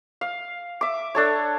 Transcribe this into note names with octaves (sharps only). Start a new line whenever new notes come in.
F5
E5 D6
D4 A4 C#5